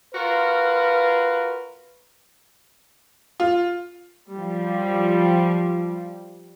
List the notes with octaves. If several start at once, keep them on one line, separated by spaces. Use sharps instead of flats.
F4 F#4 A#4 B4
F4
F3 G3